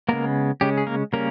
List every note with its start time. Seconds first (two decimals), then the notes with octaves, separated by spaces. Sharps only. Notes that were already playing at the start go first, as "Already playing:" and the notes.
0.09 C#3 G#3 A#3 B3 A#4
0.61 C#3 G#3 C#4 G4
0.77 G#4
0.87 A#3 A#4
1.13 C#3 G3 A#3 C#4 A#4